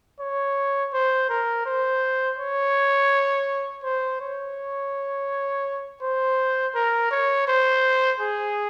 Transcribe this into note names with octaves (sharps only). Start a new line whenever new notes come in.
C#5
C5
A#4
C5
C#5
C5
C#5
C5
A#4
C#5
C5
G#4